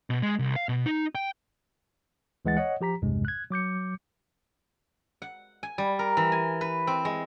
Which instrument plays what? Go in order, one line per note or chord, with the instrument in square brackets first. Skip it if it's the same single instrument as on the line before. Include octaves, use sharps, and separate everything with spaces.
[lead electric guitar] B2
G#3
C2
F5
B2
D#4
G5
[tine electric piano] D2 E3 G#3 F#5 A6
C#5 D#5 F#5
F3 G4 A#5 B6
B1 E2 G2 C3 G#3
F#6 G#6
F#3 D6 G6 C#7
[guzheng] F#5
G#5
G3
A#4
E3
G#5
B4
C4
G#3